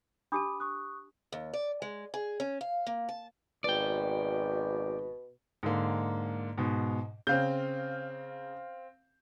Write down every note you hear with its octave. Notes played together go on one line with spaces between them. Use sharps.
D4 G4 A5 B5 D6 D#6
C#6 D#6 F#6
D#2
D5
G#3
G#4
C#4
F5
A#3
A5
G#1 B2 D5 G5
G#2 D3 A#3
G#2 B2
C#3 C4 F5 G6